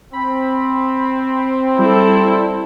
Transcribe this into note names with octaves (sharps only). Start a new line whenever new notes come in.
C4 B5
G3 E4 A4